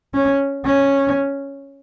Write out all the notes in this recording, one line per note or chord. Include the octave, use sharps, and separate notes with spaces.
C#4
C#4